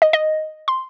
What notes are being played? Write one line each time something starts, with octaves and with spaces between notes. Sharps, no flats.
D#5
D#5
C6